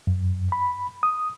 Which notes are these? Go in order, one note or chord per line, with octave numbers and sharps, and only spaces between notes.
F#2
B5
D#6